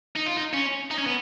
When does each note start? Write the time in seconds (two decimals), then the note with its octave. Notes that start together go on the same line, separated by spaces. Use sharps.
0.16 D#4
0.26 F4
0.37 D#4
0.53 C#4
0.91 D#4
0.99 C#4
1.06 B3